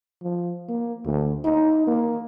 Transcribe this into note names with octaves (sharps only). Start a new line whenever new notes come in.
F3
A#3
D2
D#4
A#3